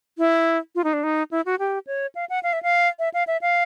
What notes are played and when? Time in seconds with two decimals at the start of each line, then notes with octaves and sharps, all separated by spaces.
0.18 E4
0.75 F4
0.84 D#4
0.93 D4
1.04 D#4
1.31 E4
1.46 F#4
1.59 G4
1.87 C#5
2.15 F5
2.30 F#5
2.43 F5
2.53 E5
2.63 F5
2.99 E5
3.14 F5
3.27 E5
3.42 F5